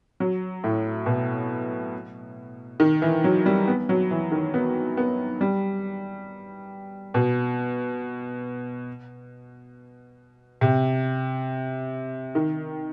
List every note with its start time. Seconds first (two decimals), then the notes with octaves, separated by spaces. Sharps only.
0.20 F#3
0.64 A2
1.06 B2
2.80 D#3
3.02 E3
3.24 F#3
3.46 G3
3.68 B3
3.89 F#3
4.11 E3
4.32 D#3
4.54 B3
4.97 B3
5.41 G3
7.14 B2
10.61 C3
12.35 D#3